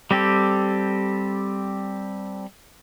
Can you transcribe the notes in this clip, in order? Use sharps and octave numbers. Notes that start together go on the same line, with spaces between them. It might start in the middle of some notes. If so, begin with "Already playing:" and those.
G3 C4 G4 A4